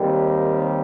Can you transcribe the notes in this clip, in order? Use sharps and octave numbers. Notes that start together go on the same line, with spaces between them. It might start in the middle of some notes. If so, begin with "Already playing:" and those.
Already playing: D#2 D#3 G3 C4